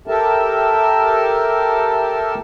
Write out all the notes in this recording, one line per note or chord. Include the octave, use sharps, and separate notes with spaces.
G4 A4 A#4 E5 A5